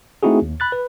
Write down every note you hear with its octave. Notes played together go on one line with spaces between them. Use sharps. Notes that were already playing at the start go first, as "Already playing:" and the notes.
A3 C4 D#4 E4 F#4 G#4
D#2
B5 F#6 A6
B4